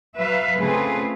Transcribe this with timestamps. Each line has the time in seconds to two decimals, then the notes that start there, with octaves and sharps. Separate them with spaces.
0.16 F#3 B4 E5 F5
0.58 C#3 A3 C4 F4 G#4 B4